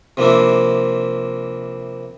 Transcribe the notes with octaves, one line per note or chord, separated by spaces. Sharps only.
C3 F3 A#3 D4 E4